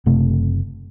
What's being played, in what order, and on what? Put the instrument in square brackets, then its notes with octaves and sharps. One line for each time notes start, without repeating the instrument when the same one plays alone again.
[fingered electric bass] F#1 C3 A3